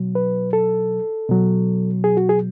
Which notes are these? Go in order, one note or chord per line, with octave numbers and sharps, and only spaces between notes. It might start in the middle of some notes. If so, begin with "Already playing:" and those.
Already playing: B2 F#3
B4
A4
B2 F#3
G#4
F#4
G#4